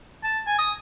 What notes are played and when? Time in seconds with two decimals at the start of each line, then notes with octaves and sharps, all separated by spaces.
0.24 A5
0.47 G#5
0.59 D#6